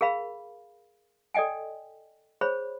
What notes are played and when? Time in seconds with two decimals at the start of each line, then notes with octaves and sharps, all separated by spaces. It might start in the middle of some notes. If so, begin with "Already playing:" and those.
0.01 G#4 A#4 F5 B5
1.34 A4 D5 D#5 G5 G#5
2.41 G#4 C5 C#5 B5